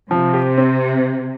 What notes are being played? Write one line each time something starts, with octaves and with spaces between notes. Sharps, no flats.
C3 F3
G4
C4